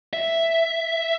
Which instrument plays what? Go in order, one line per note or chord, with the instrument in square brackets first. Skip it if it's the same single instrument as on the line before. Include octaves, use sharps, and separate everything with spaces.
[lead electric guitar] E5